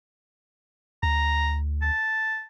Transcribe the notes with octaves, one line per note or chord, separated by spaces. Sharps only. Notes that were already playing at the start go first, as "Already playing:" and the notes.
D2 A#5
A5